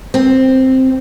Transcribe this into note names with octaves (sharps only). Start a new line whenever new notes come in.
C4